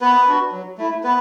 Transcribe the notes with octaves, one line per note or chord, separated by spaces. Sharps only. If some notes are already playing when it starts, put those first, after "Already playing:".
B3 B4
D4 F#4
F#3
A3 E4
B3 B4